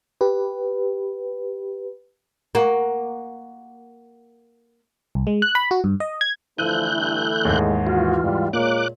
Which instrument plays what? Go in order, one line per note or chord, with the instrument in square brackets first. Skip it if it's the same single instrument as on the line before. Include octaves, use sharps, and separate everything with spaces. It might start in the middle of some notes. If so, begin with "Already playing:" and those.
[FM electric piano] G4 B4
[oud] A#3 F#4
[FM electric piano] C2
G#3
F#6
B5
F#4
G2
D#5
G#6
[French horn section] D3 E3 A3 [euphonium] F3 [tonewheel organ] E4 F#6 G6 [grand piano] D#7
[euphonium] G2
[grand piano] D#2 G#2 [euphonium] G#3
[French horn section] E3 [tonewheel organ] F4 [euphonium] F#4
[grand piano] G#2 [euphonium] G3
[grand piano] A#2 [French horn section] G#3 C#5 [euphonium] A#3 [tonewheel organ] D6 F#6